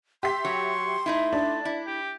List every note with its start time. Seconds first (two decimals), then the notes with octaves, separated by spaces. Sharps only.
0.23 G4 E5 C6 B6
0.45 F#3 C#5 C#6
1.06 A3 D#4 E4
1.33 D4 A5
1.65 E4
1.87 G4